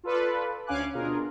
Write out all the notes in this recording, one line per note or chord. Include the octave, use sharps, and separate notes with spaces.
F4 A4 B4 D5
D2 C#4 F5 G#5 D6 F#6
B2 D4 F4 G#4 A#4